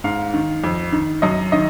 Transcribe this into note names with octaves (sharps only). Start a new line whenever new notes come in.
G#2 F5
D#3
F2
D#3
F#2 D#5
D#3 D#5